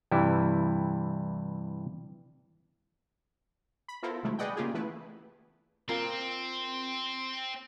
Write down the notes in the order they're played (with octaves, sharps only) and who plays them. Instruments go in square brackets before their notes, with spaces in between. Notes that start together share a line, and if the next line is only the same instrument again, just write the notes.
[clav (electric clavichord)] G2 C3 E3 G3 E4
[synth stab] B5
B3 E4 F4 A4 A#4 C5
C3 D#3 F#3 G#3 A3 E4
G#4 B4 D5 D#5 F#5 G5
C#3 A#3 F4 G4 G#4
E3 A3 B3 E4 B4
[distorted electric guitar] C4 [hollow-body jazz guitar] F4 A#4